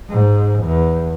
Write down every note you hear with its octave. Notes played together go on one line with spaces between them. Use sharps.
G#2
E2